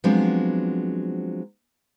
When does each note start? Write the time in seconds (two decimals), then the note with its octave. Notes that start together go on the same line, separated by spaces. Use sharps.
0.04 F3 F#3 G#3 B3 C4 D4